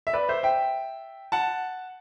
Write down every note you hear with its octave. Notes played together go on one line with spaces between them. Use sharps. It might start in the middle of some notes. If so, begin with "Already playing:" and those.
E5
B4 D5
C5 E5
E5 G5
F#5 A5